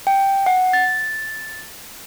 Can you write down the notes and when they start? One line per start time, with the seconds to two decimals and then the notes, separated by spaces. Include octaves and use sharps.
0.07 G5
0.46 F#5
0.73 A6